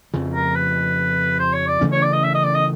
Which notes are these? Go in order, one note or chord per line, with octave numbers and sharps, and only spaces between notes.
F2 C#3 F3
A#4
B4
C5
C#5
D5
C#3 E3 A3 C#4
C#5
D5
D#5
E5
D#5
D5
D#5